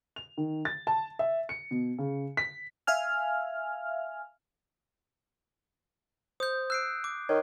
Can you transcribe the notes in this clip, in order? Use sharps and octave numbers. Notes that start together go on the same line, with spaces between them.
F7
D#3
A6
A5
E5
C#7
B2
C#3
B6
E5 F5 G#5 F6
C5 D#6 G6
E6 F#6 C7 D7
D6
D#3 C#5